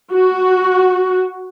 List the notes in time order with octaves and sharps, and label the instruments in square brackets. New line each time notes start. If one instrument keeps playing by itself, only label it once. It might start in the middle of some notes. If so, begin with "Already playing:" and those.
[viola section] F#4